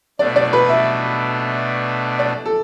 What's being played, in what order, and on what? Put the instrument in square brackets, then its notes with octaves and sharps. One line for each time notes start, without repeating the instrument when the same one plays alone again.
[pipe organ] B2 A3 D4 [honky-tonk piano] D5
[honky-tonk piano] D5
B4
E5
D5
A4